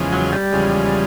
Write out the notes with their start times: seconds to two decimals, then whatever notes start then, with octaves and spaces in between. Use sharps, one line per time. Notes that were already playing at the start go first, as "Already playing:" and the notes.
Already playing: E2 C#3 F3 G#3
0.13 F#3
0.32 G3
0.53 E2 C#3 F3 G#3